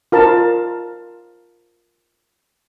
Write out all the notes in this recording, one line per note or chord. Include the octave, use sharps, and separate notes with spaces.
F4 A#4 A5